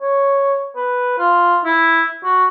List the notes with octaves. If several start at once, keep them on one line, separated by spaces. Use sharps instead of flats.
C#5
B4
F4
E4
F#4